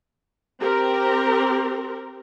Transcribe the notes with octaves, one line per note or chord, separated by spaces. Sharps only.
C4 G4 A#4